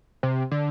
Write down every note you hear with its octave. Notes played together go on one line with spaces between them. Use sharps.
C3
D3